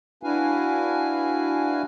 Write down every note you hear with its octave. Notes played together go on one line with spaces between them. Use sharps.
D4 E4 F#4 B4 F5 G#5